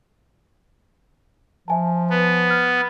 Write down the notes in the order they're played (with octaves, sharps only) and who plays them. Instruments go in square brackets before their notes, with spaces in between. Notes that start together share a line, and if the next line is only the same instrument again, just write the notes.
[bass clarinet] F3 [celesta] E5 G#5 A5
[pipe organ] B3
[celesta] F6